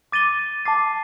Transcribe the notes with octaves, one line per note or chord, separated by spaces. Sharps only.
D6 A6 D#7 G7
A5 D6 A6 C7